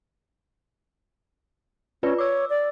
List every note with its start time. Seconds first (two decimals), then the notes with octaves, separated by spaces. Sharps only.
2.03 C#4 F4 B4 D5
2.18 C#5 D6 E6
2.50 D5